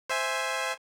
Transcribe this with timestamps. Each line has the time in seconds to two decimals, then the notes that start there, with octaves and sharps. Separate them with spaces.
0.09 C5 E5 G#5